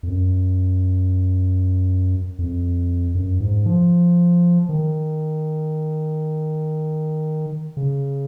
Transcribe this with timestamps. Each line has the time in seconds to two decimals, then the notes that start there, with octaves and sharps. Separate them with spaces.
0.03 F2
0.08 F#2
2.39 F2
3.15 F#2
3.40 G#2
3.66 F3
4.69 D#3
7.77 C#3